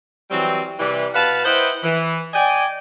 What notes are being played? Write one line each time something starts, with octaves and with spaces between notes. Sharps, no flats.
E3 F#3 G3 C4
C3 E3 G3
B2 B4 F5 F#5 A5
E4 B4 C5 D#5 F#5 G5
E3
D5 D#5 G5 G#5